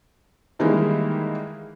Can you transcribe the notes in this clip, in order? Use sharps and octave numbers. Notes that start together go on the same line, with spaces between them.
D#3 E3 G3 G#3 A#3 E4